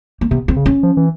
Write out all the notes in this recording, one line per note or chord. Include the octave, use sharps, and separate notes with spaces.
A#3
C3 B3
C4
C#3
C#4
F3
E3